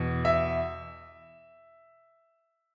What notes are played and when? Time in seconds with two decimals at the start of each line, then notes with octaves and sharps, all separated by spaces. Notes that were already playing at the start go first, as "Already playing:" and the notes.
Already playing: E2 B2
0.25 E5